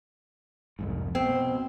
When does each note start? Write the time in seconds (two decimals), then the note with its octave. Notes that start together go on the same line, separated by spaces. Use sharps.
0.79 C2 F2 G#2
1.15 B2 C4